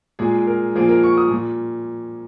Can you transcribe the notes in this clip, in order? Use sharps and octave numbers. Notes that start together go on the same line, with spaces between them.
A#2 G#3 G#4
A#4
A#2 F3 A#3 G#4
A#4
C#6
D#6
A#2